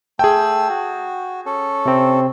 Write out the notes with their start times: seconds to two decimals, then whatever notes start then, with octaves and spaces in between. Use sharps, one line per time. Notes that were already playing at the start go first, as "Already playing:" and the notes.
0.19 A3 G#4 G5 E6
0.69 F#4
1.46 C#4 A4
1.86 C3 C4